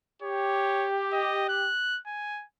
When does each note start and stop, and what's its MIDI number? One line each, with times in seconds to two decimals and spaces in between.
0.22 1.70 67
0.22 0.87 73
1.13 1.48 75
1.49 1.99 90
2.06 2.45 80